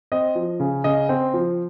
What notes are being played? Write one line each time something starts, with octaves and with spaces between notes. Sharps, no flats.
C4 D#5
F3
C#3
C#3 D#5
C4
F3